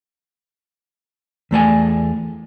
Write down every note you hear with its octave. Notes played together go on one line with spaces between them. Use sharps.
E2 A3 D5 G#5